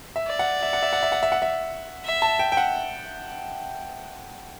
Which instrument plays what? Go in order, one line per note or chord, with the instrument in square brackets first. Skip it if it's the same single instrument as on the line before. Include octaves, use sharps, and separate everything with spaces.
[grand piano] E5
[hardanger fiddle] D5
[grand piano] F#5
E5
F#5
E5
F#5
E5
F#5
E5
F#5
E5
[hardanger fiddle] E5
[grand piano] A5
G5
G5
F#5